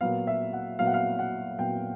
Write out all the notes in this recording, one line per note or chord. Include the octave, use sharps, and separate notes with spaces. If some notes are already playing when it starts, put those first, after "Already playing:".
A#2 F#3 B3 F5
E5
F#5
A#2 F#3 B3 F5
F#5
F5
F#5
A#2 F#3 B3 G5